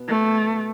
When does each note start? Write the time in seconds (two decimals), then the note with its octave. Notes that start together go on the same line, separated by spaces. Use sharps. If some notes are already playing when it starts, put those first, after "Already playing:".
Already playing: B2 B3
0.09 A3